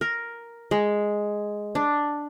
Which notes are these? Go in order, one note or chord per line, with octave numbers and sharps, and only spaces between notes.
A#4
G#3
D4